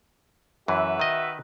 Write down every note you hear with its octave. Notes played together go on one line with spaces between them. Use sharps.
F#2 E3 F#4 B4 E5
D#3 D#5